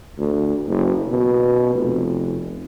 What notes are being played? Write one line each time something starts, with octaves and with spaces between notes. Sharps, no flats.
D2
F#1
B2
F1